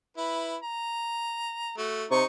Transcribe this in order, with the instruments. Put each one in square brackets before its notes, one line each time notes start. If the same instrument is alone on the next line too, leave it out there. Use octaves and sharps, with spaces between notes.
[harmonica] E4 B4
A#5
A3 F#4
[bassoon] C3 [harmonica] D#4 C#6